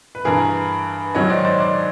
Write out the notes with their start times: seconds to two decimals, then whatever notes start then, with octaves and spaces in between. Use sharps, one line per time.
0.15 B4
0.25 G2 E3 G#4 A#4
1.15 G#2 D#3 F#3 C#5 D#5
1.30 C5 D5
1.45 C5 D5
1.60 C5 D5